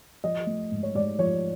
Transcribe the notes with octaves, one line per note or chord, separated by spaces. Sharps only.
F3 D#5
A3
G#2
C#5
G#2 D5
F3 C#5